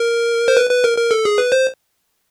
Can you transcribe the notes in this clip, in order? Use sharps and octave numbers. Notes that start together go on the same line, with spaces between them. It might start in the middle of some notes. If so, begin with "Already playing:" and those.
Already playing: A#4
C5
B4
B4
A#4
A#4
A4
G#4
B4
C5